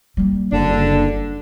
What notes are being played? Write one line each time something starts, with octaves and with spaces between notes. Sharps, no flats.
G3 A#3
F#1 D3 D4